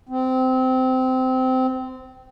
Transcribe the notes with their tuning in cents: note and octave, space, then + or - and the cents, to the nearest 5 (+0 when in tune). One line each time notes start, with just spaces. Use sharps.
C4 -20